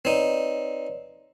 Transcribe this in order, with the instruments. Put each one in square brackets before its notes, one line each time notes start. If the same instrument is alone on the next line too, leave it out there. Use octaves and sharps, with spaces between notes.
[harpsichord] C4 D#4 [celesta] B4 C#5 D5